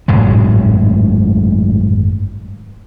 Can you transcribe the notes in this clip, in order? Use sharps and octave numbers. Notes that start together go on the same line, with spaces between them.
G#1 F#2 A2 G#3